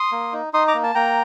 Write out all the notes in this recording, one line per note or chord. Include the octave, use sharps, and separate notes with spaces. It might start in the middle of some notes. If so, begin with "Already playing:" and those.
Already playing: C6 D#6
A#3
D#4
D#4 C6 D#6
A#5 D6
A#3
A5
A#3 G5 A#5